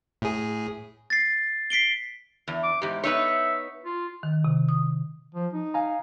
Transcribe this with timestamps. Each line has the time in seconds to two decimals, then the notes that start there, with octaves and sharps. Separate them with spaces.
0.22 A2 G#4
1.10 A6 C7
1.70 B6 C7 D7 G7
2.48 E2
2.63 D6
2.82 E2 G#2 G4
3.04 B3 D#4 C#5 E5
3.84 F4
4.23 D#3
4.44 C3
4.69 D#6
5.35 F3
5.53 D#4
5.74 F5 G#5 A#5